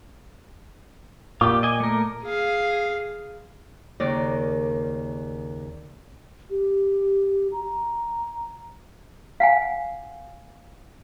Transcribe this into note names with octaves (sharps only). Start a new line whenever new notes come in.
A#2 F4 G4 D6
D#5 G#5
A3 A#4
G#4 F5
D#2 C#3 A#4 D5
G4
A#5
F5 F#5 G#5